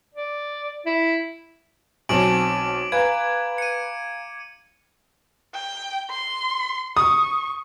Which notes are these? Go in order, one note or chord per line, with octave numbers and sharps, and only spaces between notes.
D5
E4
B1 F#3 C4 G#5 A5 D6 D7 F#7
B4 F5 G#5 A#5 G#6
C#7 D#7
G5
C6
C#6 D#6